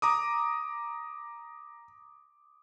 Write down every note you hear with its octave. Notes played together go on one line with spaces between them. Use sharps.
A#5 D6 D#6